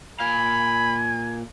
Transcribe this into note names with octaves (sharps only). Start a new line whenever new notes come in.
A#2 F5 G#5 B5